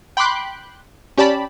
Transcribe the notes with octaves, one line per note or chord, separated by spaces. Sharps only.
G5 B5 C6 D6 F#6 G6
C#4 G4 D5 A5 B5